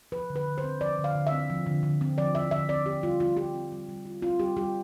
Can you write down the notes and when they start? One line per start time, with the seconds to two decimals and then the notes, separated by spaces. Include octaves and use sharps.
0.12 F3 B4
0.30 D3
0.36 B4
0.47 D3
0.58 C5
0.64 C4
0.81 F3 D5
0.99 D3
1.04 F5
1.15 D3
1.27 E5
1.32 C4
1.50 F3
1.66 D3
1.83 D3
2.01 C4
2.18 F3 D5
2.35 D3 E5
2.51 D3 E5
2.69 C4 D5
2.86 C4 G4
3.03 G3 F4
3.20 G3 F4
3.37 F4 G4
3.55 C4
3.72 G3
3.88 G3
4.05 F4
4.22 C4 F4
4.39 G3 G4
4.56 G3 G4